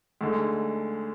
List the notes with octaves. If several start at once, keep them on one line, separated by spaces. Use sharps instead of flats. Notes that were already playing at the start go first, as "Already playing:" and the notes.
D2 D3 G#3 D#4